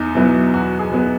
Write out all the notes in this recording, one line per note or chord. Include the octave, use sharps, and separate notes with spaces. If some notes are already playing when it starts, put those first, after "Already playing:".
Already playing: E2 D#4
B2 F#3 B3 E4
E2 F#4
G#4
B2 F#3 B3